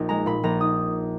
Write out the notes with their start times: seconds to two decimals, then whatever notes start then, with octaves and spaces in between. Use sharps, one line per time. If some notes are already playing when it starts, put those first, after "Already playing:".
Already playing: A#1 D#4
0.09 G#3 A#5
0.26 A#2 B5
0.43 A#1 A#5
0.61 D#4 D#6